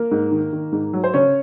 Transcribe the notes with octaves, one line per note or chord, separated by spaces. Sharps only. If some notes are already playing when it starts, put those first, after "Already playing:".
Already playing: A#3 A#4
G#2
D#3
D#3
G#2
F#3
C5
C#3 C#4 C#5